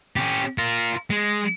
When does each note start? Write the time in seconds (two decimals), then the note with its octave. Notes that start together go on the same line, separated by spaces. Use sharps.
0.16 C#4 G4
0.58 F4 A#4
1.10 G#3